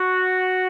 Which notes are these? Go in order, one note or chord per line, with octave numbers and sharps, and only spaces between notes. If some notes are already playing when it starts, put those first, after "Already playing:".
Already playing: F#4